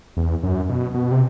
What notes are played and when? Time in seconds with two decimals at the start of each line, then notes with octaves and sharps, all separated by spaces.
0.17 E2
0.43 F#2
0.69 B2
0.95 B2
1.11 C3